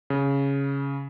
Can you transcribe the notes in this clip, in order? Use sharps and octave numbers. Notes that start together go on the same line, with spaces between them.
C#3